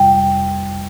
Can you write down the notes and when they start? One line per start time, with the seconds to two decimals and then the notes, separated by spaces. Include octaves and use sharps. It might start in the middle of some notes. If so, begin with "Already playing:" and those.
Already playing: F2 C3 G3 G5